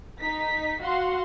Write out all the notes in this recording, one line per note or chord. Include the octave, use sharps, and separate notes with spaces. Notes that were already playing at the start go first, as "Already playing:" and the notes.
D#4 B6
F#4 F5 F#5 C6